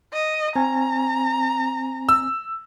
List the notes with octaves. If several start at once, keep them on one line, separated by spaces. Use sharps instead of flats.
D#5
C4 G#5 A#5
E6